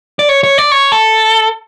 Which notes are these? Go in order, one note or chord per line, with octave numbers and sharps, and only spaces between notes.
D5
C#5
C#5
D5
C#5
A4